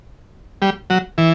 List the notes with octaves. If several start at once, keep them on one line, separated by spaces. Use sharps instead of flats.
G3
F#3
E3